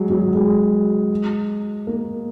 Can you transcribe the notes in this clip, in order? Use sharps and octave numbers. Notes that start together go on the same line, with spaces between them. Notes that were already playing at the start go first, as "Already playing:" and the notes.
Already playing: F#3 G#3
F#3
G#3
A#3